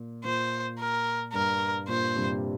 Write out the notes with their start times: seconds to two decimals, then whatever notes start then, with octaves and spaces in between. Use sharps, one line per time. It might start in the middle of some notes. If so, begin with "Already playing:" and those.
Already playing: A#2
0.24 A#2 C5
0.79 A#4
1.33 G2 A#4
1.88 A#2 C5
2.16 G2 C3